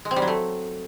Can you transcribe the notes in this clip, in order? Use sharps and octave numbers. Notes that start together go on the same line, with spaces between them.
G#3
C4
G3
F#3
A3